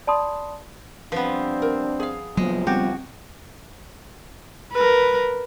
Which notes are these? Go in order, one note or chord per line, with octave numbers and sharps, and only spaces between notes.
D5 A5 B5 C6 D#6
F3 G3 B3 C4 D4 B4
A#4
G#4 F5
C#2 F3 F#3 G#3 A#3 B3
G3 B3 C4 F#4 G4
A#4 B4